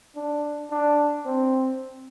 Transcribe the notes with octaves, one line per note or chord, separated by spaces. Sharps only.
D4
D4
C4